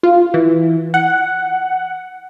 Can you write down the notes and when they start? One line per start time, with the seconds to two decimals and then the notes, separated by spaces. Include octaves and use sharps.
0.03 F4
0.34 E3
0.94 F#5